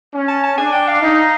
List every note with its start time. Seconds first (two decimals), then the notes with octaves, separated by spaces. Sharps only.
0.13 C#4
0.28 A5
0.43 A5
0.58 D4 G#5
0.73 G5
0.88 F5
1.02 D#4